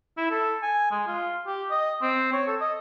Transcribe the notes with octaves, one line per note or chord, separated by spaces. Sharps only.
E4
A4
G#5
G#3
F4
G4
D#5
C4
C#5
A4
D#5